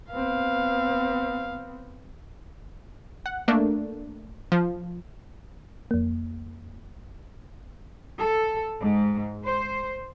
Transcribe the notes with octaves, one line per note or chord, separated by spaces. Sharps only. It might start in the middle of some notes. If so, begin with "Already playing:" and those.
B3 C4 F5
F#5
A3 A#3 D4
F3
F2 A#3
A4
G#2
C5